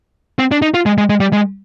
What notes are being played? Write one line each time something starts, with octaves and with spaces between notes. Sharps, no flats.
C4
D4
D#4
F4
G#3
G#3
G#3
G3
G#3